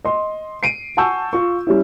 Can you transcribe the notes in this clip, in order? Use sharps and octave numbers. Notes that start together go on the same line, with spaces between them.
D#5 C6
C7 D7 D#7
F#5 G#5 A5 C#6 E6 G6
F4 C#6
G3 C#4 E4